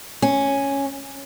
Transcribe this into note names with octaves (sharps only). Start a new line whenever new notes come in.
C#4